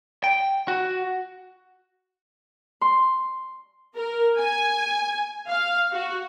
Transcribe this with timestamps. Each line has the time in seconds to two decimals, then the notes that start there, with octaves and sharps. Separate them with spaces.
0.24 G5
0.68 F#4
2.81 C6
3.95 A#4
4.38 G#5
5.47 F5
5.93 F#4